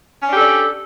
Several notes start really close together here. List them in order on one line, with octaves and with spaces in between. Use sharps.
C#4 D4 G4 A4 D5